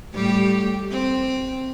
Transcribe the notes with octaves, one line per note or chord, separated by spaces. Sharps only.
A2 G3 G4
C4